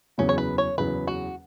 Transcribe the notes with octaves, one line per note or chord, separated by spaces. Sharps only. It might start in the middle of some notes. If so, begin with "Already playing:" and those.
F#1 E2 C#3 F#3 B3 C#4
C#5
B4
C#5
F#1 E2 C#3 F#3 B3 B4
F#4